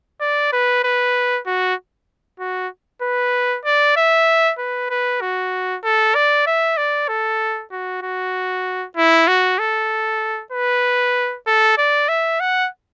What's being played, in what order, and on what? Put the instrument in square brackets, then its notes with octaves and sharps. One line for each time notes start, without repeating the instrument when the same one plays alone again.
[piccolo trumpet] D5
B4
B4
F#4
F#4
B4
D5
E5
B4
B4
F#4
A4
D5
E5
D5
A4
F#4
F#4
E4
F#4
A4
B4
A4
D5
E5
F#5